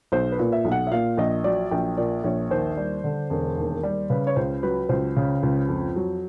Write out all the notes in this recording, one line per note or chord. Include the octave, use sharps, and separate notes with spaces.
B1 C5
B4
A#2
E5
B1
F#5
E5
A#2 F5
A#1 D#5
F#3 D5
A#1 G5
A#2 D5
A#1 C#5
D#2 C5
G3
D3
E1
D#2
G3
C#3 B4
C#5
C#2 C5
F#3 B4
C#2 C5
C#3
C#2
F2
F#3